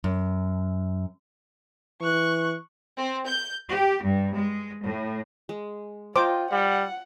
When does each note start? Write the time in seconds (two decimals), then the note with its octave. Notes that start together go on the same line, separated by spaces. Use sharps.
0.04 F#2
2.01 E3 C#6 F#6
2.97 C4
3.27 G6
3.69 G4
4.02 G2
4.34 G#3
4.83 A2
5.49 G#3
6.16 F4 C5 D#5 G5 A#5 D6
6.51 G3 F#5